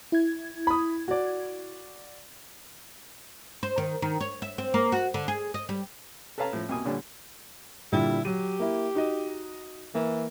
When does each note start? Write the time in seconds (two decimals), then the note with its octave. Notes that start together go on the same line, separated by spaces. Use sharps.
0.12 E4 G#6
0.67 B5 D#6
1.08 F#4 D5
3.63 C5
3.78 D#3
4.02 D#3
4.20 C#5
4.42 E5
4.58 C4
4.74 A#3
4.92 F#4
5.14 D3
5.28 G#4
5.54 D#5
5.69 G3
6.38 A4 B4 C#5 F5 A5 A#5
6.53 A2 F3
6.69 C2 B2 A#3 G#5 D#6
6.85 A#2 D3 G3 C#4 D4
7.92 A#2 D3 G3 E4
8.25 F#3 G4 D#7
8.60 A#3 E4
8.95 D#4 F#4 D#5
9.95 E3 A#3